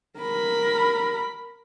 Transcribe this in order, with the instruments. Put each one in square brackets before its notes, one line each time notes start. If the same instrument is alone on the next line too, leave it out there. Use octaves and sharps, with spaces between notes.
[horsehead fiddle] A#4 B5